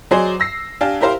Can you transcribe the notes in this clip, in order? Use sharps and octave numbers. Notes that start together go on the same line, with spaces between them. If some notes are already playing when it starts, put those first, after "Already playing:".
F#3 G#4 C5 D5 D#5
E6 A#6 C7
D4 G4 F5 G#5 A5
E4 G4 A#4 C5 F5